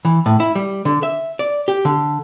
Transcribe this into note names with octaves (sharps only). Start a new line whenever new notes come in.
E3
A2
E4
G3
D3
E5
D5
G4
D3